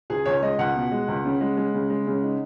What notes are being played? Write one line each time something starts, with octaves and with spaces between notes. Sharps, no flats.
C#2 G#4
C#2 C#5
G#3 D#5
C#2 F#5
B2
G#3
C#2
C#3
G#3
G#3
C#3
G#3
C#3
D#4